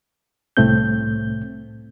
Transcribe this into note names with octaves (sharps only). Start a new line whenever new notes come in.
C2 A2 A3 C4 G6